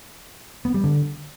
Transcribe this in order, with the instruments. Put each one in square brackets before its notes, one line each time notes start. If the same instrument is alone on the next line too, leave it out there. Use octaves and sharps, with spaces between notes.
[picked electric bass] B3
G3
D3